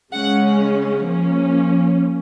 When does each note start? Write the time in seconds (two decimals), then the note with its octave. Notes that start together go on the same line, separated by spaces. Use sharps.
0.13 C#3 G#3 C#4 F#5
1.06 F3 A#3 C#4